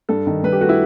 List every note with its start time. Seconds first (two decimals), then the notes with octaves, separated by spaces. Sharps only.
0.09 G2 A4
0.27 D#3
0.43 G2 B4
0.52 G4
0.61 A3 F#4
0.69 E4